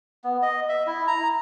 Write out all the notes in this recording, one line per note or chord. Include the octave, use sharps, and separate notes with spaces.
B3
D#5
E5
E4
A#5